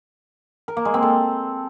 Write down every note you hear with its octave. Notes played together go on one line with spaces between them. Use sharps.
A#4
A#3
G#3
C4
A4